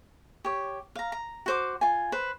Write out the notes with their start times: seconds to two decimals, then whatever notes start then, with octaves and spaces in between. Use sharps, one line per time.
0.45 G4 C#5
0.95 F5 A#5
1.12 A#5
1.46 F#4 C5 D6
1.81 F4 G#5
2.12 B4 C5